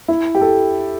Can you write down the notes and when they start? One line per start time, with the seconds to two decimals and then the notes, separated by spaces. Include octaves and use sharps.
0.08 E4
0.35 G4
0.41 A4